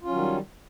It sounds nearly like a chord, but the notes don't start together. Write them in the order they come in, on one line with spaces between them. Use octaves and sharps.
F4 C#4 F#3 D#3 G3